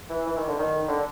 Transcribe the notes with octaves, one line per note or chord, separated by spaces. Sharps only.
E3
E3
D#3
D3
D#3
D3